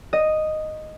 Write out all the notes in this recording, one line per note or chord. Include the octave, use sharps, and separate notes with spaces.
D#5